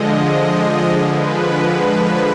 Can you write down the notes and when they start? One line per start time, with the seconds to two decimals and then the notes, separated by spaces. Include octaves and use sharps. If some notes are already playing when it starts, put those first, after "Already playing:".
Already playing: D3 F3 G#3 D#5
1.08 B4